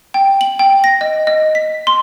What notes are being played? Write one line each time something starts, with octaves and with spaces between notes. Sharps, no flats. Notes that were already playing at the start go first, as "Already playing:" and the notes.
G5
F#7
G5
A#6
D#5
D#5
B6
C6